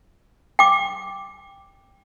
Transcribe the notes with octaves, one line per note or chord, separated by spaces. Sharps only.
G5 D6